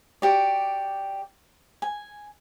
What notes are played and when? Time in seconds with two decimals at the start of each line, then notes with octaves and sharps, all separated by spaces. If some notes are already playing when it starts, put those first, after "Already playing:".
0.22 F#4 G4 D5
1.82 G#5